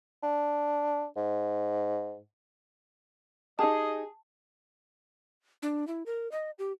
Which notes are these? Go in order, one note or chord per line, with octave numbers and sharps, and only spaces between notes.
D4
G#2
D#4 G4 G#4 D#5 A5
D4
E4
A#4
D#5
G4